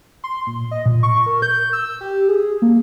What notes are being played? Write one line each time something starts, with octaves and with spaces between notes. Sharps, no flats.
C6
A#2
D#5
A#2
C#6
A#4
G6
E6
G4
G#4
A#3